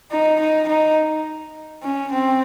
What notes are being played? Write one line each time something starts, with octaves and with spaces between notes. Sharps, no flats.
D#4
D#4
D#4
C#4
C4